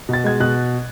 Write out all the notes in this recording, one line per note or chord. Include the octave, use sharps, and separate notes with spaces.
B2 A6
G#3 G#6
B2 F#6